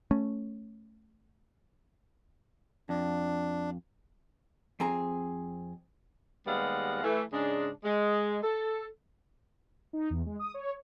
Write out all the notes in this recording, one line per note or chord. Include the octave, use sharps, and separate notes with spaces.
A3 C#4
F2 D4
F2 C4 G#4 A#5
D#2 G3 G#3 B3 F5 F#5
E3 A3
G#2 C#3 G#3 D4
G#3
A4
D#4
E2
G#3
D#6
C#5